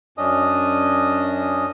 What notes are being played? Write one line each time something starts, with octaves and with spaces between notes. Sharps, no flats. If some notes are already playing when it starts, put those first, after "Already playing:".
F#2 C#4 D4 D#5 D#6